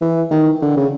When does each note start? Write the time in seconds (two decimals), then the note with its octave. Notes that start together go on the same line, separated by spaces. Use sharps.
0.01 E3
0.31 D#3
0.62 D3
0.77 C#3